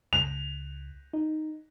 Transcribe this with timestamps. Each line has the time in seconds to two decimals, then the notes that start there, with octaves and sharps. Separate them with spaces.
0.13 C#2 F7
1.13 D#4